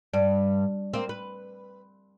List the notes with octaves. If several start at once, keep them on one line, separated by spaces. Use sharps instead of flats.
G2 D5
A#3 C4
B4